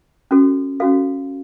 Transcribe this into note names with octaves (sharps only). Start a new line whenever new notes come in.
C#4 F#4 A4
C#4 F#4 A4 F5